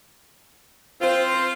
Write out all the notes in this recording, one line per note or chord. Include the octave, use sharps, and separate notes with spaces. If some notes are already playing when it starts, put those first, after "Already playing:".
C4 F4 C5